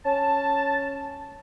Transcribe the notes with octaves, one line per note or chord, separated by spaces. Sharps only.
C#4 A5